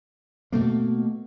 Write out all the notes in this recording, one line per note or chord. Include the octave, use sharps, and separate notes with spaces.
B2 A3 A#3